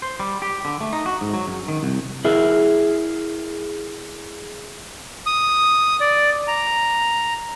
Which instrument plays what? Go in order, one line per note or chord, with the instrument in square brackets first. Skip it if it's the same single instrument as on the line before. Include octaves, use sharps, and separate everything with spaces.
[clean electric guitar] C5
G3
G4
D3
A3
D#4
F#4
G#2
F#3
F#2
D#3
C2
[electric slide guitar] E4 G#4 A#4 E5
[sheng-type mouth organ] D#6
D5
A#5